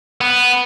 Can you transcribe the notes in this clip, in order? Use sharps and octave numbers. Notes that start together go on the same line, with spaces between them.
B3